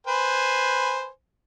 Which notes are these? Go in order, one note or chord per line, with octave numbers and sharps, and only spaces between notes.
B4 C5 G#5